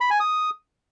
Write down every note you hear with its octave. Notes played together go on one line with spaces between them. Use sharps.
B5
G#5
D#6